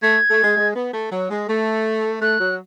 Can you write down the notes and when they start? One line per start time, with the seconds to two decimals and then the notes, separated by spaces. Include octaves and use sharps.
0.03 A3 G#6
0.30 A3
0.44 G#3
0.57 G#3
0.76 B3
0.94 A3
1.12 F#3
1.30 G#3
1.49 A3
2.21 A3 F#6
2.40 F#3